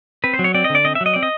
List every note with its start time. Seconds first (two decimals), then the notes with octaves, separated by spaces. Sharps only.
0.24 C4 B4
0.34 C5
0.39 F#3
0.44 C#5
0.54 C4 D5
0.64 D#5
0.70 D3
0.75 D5
0.85 C4 D#5
0.95 E5
1.01 F#3
1.06 D#5
1.14 C4 D5
1.23 D#5